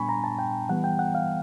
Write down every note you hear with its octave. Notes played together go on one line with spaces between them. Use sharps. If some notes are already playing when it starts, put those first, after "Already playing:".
Already playing: A#2 G3 B3 D4 G#5 B5 C#6
A#5
A5
G5
E3 G3 B3 F#5
G5
F#5
F5